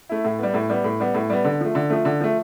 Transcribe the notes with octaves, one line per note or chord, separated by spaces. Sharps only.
A3 E4
A2
G3 B3
A2
G3 B3
A2
G3 B3
A2
G3 B3
D3
F3 A3
D3
F3 A3
D3
F3 A3